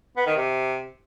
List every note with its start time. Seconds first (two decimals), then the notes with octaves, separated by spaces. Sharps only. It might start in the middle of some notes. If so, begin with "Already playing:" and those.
0.17 B3
0.27 D#3
0.36 C3